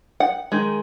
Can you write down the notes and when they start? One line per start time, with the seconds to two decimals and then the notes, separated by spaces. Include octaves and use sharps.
0.20 F#5
0.52 D#3 G#3